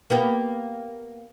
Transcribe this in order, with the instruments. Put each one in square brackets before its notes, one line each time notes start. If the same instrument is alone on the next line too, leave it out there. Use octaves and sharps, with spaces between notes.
[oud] A#3 B3 G4